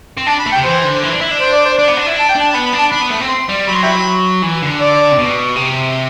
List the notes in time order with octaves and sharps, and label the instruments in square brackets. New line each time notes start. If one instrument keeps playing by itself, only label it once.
[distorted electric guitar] C4
[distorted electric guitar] D4 [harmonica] A5
[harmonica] B5
[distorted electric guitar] A3
[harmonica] G5
[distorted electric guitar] C3
[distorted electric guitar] E3 [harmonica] C5
[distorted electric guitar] D3
E3
D4
E4
D4
[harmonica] C5
D5
C5
[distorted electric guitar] D4 [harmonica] D5
[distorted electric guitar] B3
D4
E4
[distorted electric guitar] D4 [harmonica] A5
[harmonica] G5
[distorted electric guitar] D4
[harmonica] A5
[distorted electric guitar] B3 [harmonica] B5
[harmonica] B5
[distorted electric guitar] D4
[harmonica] A5
[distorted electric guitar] D4 [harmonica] B5
[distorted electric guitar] B3
A3
C4
[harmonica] C6
[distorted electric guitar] G3
[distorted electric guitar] F#3 [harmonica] B5
[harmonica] C6
E5 G5 B5
[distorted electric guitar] E3
D3
[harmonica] D5
[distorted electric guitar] C3
B2
C3